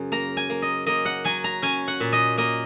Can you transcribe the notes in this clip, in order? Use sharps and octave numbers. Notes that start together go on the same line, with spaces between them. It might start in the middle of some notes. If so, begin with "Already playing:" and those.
Already playing: F#2 C#3
A#3 A#5
G#5
A#3
D#5
A#3 D#5
F#5
F#3 G#5
A#5
C#4 G#5
F#5
A#2
D#5
A#3 D#5